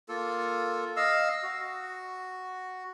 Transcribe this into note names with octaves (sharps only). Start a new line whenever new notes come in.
A#3 F4 A4
D#5 F5 E6
F#4